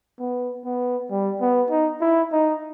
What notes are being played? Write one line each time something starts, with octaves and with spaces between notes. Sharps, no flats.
B3
B3
G3
B3
D#4
E4
D#4